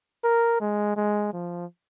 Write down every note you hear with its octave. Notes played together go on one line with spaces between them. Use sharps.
A#4
G#3
G#3
F3